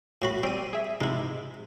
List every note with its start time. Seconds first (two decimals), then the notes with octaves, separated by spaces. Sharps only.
0.22 A2 F#4 B5
0.43 G3 C4 D#7
0.73 G#4 E5
1.01 G#2 C3 G#3 D#4 E4